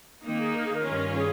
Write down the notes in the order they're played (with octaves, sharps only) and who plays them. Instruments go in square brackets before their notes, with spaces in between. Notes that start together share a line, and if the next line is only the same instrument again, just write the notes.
[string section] D#3 A#3 D#4 [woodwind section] C4
[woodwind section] G#4
A#4
G#4
A#4
[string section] G2 D#3 G3 C#4 F4
[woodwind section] G#4